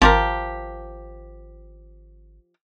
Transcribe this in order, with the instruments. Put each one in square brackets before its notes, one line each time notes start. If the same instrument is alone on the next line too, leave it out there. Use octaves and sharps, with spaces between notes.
[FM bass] G#1 [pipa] F3 G4 A#4